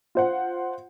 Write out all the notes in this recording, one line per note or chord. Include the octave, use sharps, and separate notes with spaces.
F4 C5 F#5